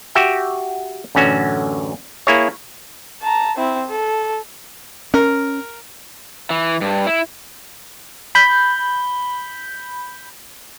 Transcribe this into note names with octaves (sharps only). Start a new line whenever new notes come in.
F#4 G4 E5 G5
A1 F#2 D3 C#4 F#4
A#3 E4 G#4 C#5
A5 A#5
C4 E4
A4
C#4 A#4
E3
G2
E4
B5 G6